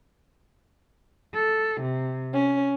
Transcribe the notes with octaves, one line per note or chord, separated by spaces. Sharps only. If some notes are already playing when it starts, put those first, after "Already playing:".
A4
C3
C#4